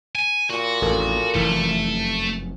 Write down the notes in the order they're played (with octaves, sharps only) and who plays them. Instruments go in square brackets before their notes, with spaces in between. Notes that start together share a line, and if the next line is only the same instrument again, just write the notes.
[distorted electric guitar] G#5
[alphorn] A#2 [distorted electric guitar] F#4
[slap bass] A1 F2 [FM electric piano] A4 A#4 A5
[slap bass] F1 F#2 [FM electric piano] E3 [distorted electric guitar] A3